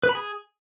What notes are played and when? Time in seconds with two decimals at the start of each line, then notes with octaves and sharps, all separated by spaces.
0.03 B4
0.09 B5
0.15 G#4